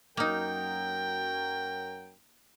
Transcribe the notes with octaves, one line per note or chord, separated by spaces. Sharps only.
F#2 F#3 A#3 D#4 A#4 G5